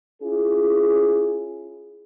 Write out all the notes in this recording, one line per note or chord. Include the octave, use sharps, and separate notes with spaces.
C#4 E4 F4 G#4